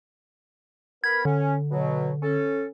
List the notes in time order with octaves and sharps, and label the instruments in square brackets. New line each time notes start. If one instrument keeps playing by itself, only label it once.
[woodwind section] B3 A#4 B5 [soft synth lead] G#6
[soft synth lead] D3 [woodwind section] C#4
[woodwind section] B2 F#3
C#4 A4